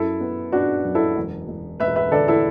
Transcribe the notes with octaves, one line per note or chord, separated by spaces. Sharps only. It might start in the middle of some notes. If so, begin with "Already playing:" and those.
Already playing: F#2 E4 A4
B3
B3 D4 F#4
F#2
E4 A4
E1
E1
E1 B4 E5
B4 E5
D3 A4 D5
E4 A4